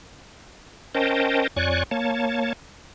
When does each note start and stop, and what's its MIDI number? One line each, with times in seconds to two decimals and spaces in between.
0.95 1.47 61
0.95 1.47 70
0.95 1.47 72
0.95 1.47 75
0.95 1.47 79
0.95 1.47 81
1.56 1.83 41
1.56 1.83 73
1.56 1.83 74
1.56 1.83 80
1.56 1.83 85
1.56 1.83 90
1.91 2.53 58
1.91 2.53 73
1.91 2.53 81